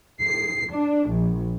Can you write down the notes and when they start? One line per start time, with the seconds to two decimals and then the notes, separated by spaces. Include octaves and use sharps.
0.19 C7
0.70 D4
1.08 A#1